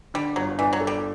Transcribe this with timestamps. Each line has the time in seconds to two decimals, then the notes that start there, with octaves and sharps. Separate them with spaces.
0.14 D3 G3
0.36 G1 F#3
0.59 E3 D4
0.73 F#3
0.80 A4
0.87 G3